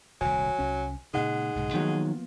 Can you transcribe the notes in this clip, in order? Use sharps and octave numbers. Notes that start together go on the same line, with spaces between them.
D#1 C2 F#3 G#5
C2 C#4
A#2 C#3 G#3 D#4 F#5
B1 G#2 C#3
D#3 F3 F#3 A#3 B3